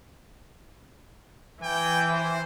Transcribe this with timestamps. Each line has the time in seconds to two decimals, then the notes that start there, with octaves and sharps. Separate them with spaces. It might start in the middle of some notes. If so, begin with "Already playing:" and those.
1.63 E3 G5
2.12 C5